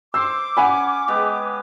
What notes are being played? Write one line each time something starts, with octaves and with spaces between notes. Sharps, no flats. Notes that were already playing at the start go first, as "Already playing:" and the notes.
C5 C6 D6 E6
C#4 F#5 G#5 B5
G#3 B3 G4